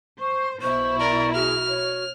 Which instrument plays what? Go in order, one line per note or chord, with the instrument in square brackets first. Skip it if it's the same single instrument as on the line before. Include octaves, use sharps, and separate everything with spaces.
[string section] C5 [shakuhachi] C#6
[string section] B1 B2 E4 [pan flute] C5 [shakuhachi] C#6
[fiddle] A#4 [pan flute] D5
[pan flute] F#4 [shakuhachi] G#4 [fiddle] F6
[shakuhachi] C#5